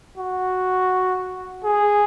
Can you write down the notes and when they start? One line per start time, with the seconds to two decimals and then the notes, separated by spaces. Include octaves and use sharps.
0.18 F#4
1.64 G#4